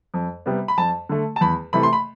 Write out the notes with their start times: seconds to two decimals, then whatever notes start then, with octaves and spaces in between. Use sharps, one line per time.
0.14 F2
0.46 C3 G3 B3
0.68 B5
0.77 F2 A5
1.09 D3 A3
1.36 A5
1.41 E2 B5
1.73 C3 E3 A3 B5
1.83 C6
1.93 B5